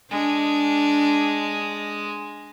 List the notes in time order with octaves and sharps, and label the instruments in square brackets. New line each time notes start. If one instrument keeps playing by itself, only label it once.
[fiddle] G#3 [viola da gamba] D4